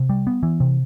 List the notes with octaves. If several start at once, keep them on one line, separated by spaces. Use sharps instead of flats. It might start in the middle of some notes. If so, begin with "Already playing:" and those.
Already playing: C3
G3
B3
E3
C3